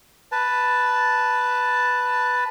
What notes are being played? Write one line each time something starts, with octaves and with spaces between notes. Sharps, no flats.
B4 A5